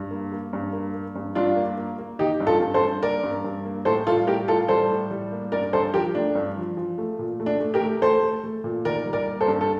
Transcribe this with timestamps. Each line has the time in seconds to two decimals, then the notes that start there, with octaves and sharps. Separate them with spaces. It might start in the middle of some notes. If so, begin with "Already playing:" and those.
Already playing: G2
0.11 A#3
0.32 A#3
0.53 G2
0.73 A#3
0.94 A#3
1.15 G2
1.35 G2 D4 F4
1.56 A#3
1.78 A#3
1.99 A#3
2.19 D#3 D#4 G4
2.40 G2
2.47 F4 A4
2.61 G2
2.74 A4 C5
2.82 G2
3.03 A#3 A#4 D5
3.23 G2
3.44 G2
3.65 A#3
3.85 A2 A4 C5
4.07 G3 F4 A4
4.27 A2 G4 A#4
4.48 A2 F4 A4
4.68 G3 A4 C5
4.90 A2
5.11 G3
5.32 A#3
5.52 G2 A#4 D5
5.73 G2 A4 C5
5.94 F3 G4 A#4
6.15 A3 D4
6.35 G2
6.56 F3
6.77 F3
6.98 A3
7.19 A#2
7.40 A3
7.46 D4
7.60 A3
7.74 G4 A#4
7.81 A3
8.02 A3 A4 C5
8.23 A3
8.44 A3
8.64 A#2
8.85 D#3 A#4 D5
9.06 G3
9.13 A#4 D5
9.26 A#3
9.41 A4 C5
9.48 G2
9.61 A4